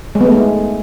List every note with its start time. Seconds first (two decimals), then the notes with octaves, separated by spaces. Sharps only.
0.15 G#3
0.21 B3
0.26 A3
0.32 G#3